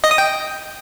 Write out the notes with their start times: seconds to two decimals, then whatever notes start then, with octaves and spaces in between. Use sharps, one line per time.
0.04 D#5
0.11 D#6
0.18 G5